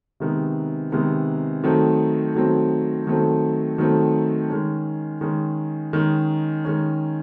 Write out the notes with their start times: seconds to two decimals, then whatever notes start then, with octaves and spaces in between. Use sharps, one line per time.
0.20 C3 D#3 G#3 B3
0.92 C3 D#3 G#3 B3
1.64 D#3 F#3 A3 C4
2.35 D#3 F#3 A3 C4
3.07 D#3 F#3 A3 C4
3.78 D#3 F#3 A3 C4
4.50 D#3 G#3 C#4
5.21 D#3 G#3 C#4
5.93 D#3 G#3 C#4
6.65 D#3 G#3 C#4